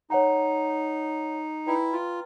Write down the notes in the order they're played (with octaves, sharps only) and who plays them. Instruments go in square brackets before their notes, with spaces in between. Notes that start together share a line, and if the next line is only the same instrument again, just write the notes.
[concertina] D#4 [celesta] C#5 F#5 A#5
[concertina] E4 [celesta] B4 D5 G5 A#5
[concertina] F4